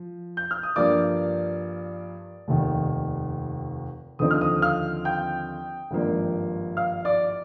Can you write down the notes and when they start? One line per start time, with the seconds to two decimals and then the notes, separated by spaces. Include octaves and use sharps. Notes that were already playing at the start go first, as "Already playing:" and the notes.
Already playing: F3
0.37 G6
0.51 F6
0.63 D#6
0.76 G2 F3 A#3 D5 D6
2.48 F1 D#2 D#3
4.19 D#2 D3 F3 C4 D#4 D#6
4.31 F6
4.41 D#5 D#6
4.62 F5 F6
5.05 G5 G6
5.91 G#1 G2 F3 A#3
6.77 F5 F6
7.05 D5 D6